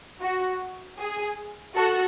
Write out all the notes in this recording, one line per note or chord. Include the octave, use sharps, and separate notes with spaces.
F#4
G#4
F#4 A4